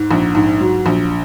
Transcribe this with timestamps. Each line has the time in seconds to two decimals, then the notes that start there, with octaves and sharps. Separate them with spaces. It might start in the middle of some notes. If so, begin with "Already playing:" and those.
Already playing: G#2
0.11 A#1
0.35 G#2
0.61 F#3
0.86 A#1